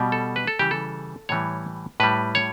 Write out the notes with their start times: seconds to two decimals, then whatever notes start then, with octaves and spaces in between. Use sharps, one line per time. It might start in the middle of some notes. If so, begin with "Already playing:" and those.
Already playing: B2 G3
0.12 A4
0.36 B4
0.47 A4
0.59 C#3 E3 G3 G4
0.71 A4
1.29 A2 E3 G3 C#5
2.00 A2 G3 B4
2.35 C#5